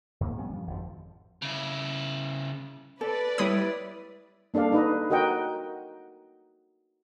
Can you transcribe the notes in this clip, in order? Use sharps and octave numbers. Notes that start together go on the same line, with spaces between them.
G#2 A#3
F3 G3 B3 C#4
G2 F3
G#1 F2 D#3 F3
C#3 E4
A4 B4 D5
G3 E4 C#5 B5 D#6
A#3 D4 A4 D5 F5
D#4 B4 D#5
F#4 A#4 D#5 F#5 G5 A#5